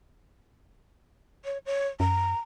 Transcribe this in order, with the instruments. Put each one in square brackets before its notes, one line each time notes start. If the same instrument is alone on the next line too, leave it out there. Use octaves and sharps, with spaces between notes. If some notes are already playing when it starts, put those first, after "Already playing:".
[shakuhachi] C#5
C#5
[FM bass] F#2 [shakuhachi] A#5